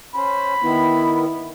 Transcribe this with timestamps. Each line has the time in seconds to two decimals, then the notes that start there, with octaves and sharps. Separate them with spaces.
0.16 C#4 C5 B5
0.63 D#3 B3 E4